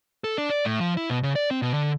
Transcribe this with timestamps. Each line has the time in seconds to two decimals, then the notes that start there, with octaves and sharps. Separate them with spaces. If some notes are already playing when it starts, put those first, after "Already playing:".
0.24 A4
0.38 D4
0.50 D5
0.65 A2
0.81 F3
0.97 E4
1.10 B2
1.23 C#3
1.36 D5
1.51 C4
1.62 B2
1.74 D3